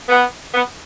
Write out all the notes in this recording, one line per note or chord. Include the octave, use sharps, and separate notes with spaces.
B3
B3